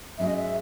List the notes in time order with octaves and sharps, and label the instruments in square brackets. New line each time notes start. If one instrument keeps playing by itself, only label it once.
[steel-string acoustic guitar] G#2 F#3 C#4 G#4 [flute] E5
[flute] D#5
E5